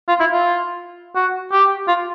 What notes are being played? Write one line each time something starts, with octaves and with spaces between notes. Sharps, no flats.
F4
E4
F4
F#4
G4
F4